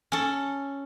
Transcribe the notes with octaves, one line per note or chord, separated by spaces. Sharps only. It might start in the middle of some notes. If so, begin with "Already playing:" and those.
C#4 A4